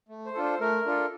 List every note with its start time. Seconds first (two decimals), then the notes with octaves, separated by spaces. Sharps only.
0.09 A3
0.26 C5
0.34 D4 F4 A4
0.43 C5
0.60 A3 A#4
0.86 D4 F4 A4